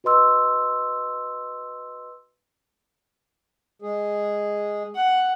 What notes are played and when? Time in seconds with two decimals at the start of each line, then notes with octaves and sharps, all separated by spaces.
0.04 F#4 B4 D#5 C6 E6
3.82 G#3 G#4
4.95 F#5